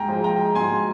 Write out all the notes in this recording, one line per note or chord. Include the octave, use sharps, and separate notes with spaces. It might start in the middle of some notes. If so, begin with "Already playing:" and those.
Already playing: G#2 G5 G#5 A#5
F3 G#3
G5 A#5
G#2 G#5 C6